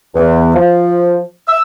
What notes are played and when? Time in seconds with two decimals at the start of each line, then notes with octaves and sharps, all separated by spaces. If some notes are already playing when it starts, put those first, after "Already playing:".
0.14 E2
0.54 F3
1.48 E6